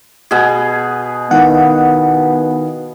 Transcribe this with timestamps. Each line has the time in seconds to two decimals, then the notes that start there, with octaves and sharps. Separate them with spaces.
0.31 B2 G#4
1.31 D#3 B3 E4 F5 F#5